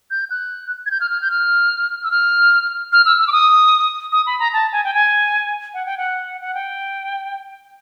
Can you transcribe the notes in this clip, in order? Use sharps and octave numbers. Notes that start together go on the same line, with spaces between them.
G6
F#6
G#6
G6
F6
F6
G6
F6
E6
F6
F6
E6
E6
D6
D#6
D#6
B5
A#5
A5
G#5
G5
G#5
F#5
G5
F#5
F#5
G5